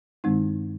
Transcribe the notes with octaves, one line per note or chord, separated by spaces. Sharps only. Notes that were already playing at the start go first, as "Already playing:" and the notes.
G2 D#3 G#3 C4 D#4